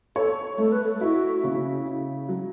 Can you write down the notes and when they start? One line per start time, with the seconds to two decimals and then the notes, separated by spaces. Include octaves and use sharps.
0.16 A4 C#5
0.58 A3 A4
0.72 B4
0.84 A4
1.00 E4 F#4
1.44 C#3
1.86 E4
2.29 F#3